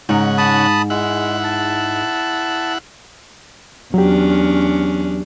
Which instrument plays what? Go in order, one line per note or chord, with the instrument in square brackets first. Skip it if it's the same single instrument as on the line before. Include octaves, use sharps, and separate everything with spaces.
[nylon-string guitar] G#2 [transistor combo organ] C#3 F#5 [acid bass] D#4
[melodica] A5 B5 D#6
[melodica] G#3 [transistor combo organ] E4 F#5
[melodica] A5
[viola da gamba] E2 C#4 D4 [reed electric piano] F#3 G4